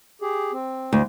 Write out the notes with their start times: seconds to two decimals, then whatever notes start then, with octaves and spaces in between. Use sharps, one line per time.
0.22 G4 G#4
0.52 C4
0.93 D2